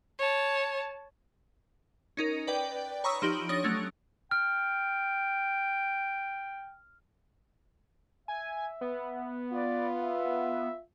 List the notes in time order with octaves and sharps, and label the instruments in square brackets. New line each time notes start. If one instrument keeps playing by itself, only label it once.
[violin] C#5 A5
[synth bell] C#4 D#4 A#4
B4 D5 G5
C#5 A#5 B5 C#6 D#6 E6
F3 D#4 G4 D7 F#7
D4 C#5 D#6 A#6
F#3 A3 C#4
[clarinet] G5 [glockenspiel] F6
[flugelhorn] E5 [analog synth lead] G#5
[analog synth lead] B3
[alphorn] F4 [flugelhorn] D5
[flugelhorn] E5